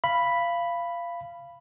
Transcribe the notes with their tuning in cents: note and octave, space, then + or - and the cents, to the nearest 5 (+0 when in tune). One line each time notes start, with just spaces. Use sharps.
F5 -20 B5 +0